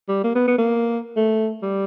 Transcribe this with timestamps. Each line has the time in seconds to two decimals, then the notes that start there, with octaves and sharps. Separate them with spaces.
0.08 G3
0.24 A#3
0.35 B3
0.48 B3
0.58 A#3
1.16 A3
1.63 G3